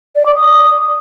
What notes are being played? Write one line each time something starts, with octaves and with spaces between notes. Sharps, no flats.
D5
D6
D#6